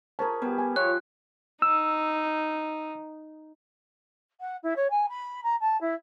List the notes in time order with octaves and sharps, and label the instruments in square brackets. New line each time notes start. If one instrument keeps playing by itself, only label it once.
[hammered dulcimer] C#4 G#4 [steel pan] A#4 C5 A5
[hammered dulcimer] G3 [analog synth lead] B3
[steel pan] G#5
[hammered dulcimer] F3 [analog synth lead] C#5 [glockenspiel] F#6
[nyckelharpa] D#4 [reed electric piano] E6
[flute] F#5
E4
C#5
G#5
B5
A#5
A5
E4